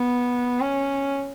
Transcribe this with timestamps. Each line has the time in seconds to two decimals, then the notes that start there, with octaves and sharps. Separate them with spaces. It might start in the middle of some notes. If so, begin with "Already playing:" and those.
Already playing: B3
0.60 C#4